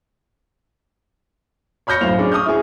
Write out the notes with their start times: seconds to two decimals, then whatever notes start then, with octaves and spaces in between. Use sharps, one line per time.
1.87 C#5 B5 F6 G6 A#6 C#7
2.01 F#2 A2 C5 F5 F7
2.19 C#4 D4 G#4
2.32 C#6 D#6 F6 G6
2.46 E4 G#4